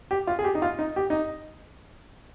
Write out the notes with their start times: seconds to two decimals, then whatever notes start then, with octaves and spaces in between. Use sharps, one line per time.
0.11 G4
0.27 F4
0.39 G#4
0.44 G4
0.55 D#4
0.62 F4
0.79 D#4
0.96 G4
1.10 D#4